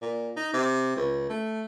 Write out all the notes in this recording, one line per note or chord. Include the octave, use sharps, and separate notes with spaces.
A#2
D#4
C3
C#2
A3